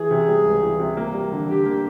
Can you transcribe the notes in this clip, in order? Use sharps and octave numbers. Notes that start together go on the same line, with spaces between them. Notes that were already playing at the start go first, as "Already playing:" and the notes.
Already playing: E3 G#4
C3
G3
C#2
E3
C3
A#3
G3
D3
D3 G4
A#3